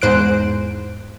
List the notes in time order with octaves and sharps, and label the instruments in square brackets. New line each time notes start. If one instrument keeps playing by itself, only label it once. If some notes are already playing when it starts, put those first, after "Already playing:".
[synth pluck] E2 G#2 C5 F#6 D7